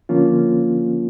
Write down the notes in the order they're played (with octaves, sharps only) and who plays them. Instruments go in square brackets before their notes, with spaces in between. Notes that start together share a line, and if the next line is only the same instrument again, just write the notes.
[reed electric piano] D3 F3 A#3 C#4 F4